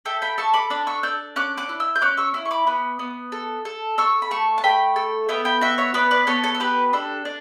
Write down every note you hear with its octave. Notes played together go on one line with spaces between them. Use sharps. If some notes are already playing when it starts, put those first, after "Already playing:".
A4 E5 G5
G5 B5
A4 A5 C#6
B5 D6
D4 B5 D6
C#6 E6
D4 E6 G6
C#4 D6 F#6
D6 F#6
E4
E6 G6
G6
C#4 D6 F#6
C#6 E6
E4
C#6
B5 D6
B3
B3
A4
A4
A4 C#6 E6
B5
A3 A5 C#6
A5
A3 G5 B5
A4
B3 E5 G5
G5 B5
F#4 E5 G5
C#5 E5
B3 B4 D5
B4 D5
B3 A4 C#5
A4 C#5
A4
G4 B4
D4 A4
D4